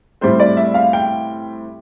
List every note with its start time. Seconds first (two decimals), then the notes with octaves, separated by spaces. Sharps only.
0.21 A2 G3 C4 C5
0.40 D5
0.57 E5
0.74 F5
0.93 G5